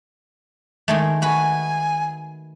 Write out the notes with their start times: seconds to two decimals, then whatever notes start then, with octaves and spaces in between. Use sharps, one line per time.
0.88 D#3 G#3 A3
1.22 F#4 B4 G#5